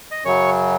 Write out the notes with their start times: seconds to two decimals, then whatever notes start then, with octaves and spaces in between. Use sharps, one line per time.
0.11 D#5
0.24 F#2 C#3 F#3 C#5